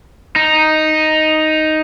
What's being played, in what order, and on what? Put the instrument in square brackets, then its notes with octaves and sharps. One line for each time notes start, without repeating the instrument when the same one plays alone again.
[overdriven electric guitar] D#4